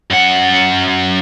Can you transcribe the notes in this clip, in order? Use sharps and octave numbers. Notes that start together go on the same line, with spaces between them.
F#2 F#5